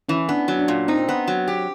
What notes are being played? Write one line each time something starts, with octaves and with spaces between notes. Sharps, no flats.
E3 C#4
B3 D4
F#3
D4
A#2
C4 D#4
B3
F#3
G4